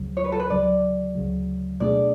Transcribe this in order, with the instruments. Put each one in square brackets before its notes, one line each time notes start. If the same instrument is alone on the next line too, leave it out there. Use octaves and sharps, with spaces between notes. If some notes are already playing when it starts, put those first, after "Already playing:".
Already playing: [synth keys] D2 C#3 F#3
[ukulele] C#5
B4
A4
B4
[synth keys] D2 C#3 F#3 [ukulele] D5
[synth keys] D2 C#3 F#3
[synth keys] B2 A3 D4 G#4 [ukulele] D5